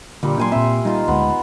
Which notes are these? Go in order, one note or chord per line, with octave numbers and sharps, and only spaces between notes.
A#2 D3 G3
F#3 A#3 D4 G5 G#5 C6
A#2 C4 E5
D#3 G3 F4
D2 D3 G#3 B3